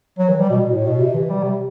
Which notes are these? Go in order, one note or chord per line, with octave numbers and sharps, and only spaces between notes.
F#3
E3
G3
B2
B2
A2
B2
C3
E3
G3
C3